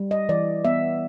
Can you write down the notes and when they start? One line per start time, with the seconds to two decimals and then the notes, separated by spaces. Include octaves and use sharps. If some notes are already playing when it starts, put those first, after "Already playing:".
Already playing: G3
0.11 D#5
0.29 E3 D5
0.65 B3 E5